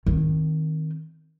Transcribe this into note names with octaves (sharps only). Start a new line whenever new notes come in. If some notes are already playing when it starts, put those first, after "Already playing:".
D#3 C4